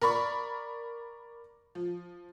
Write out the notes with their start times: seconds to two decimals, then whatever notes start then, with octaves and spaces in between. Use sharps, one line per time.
0.01 A#4 D5 B5 C#6
1.75 F3